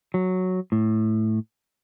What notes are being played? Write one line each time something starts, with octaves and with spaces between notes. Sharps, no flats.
F#3
A2